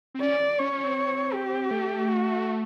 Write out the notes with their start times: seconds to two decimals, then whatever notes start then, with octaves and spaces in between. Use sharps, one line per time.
0.15 C4
0.22 C#4 D5
0.60 C#4 C#5
0.72 C#4
0.83 C4
1.34 G4
1.71 A3
2.08 F#4